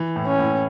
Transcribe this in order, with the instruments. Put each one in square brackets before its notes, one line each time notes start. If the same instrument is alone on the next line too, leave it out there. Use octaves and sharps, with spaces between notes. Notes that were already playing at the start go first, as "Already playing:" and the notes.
Already playing: [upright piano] E3
A2
[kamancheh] C#4
[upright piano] A2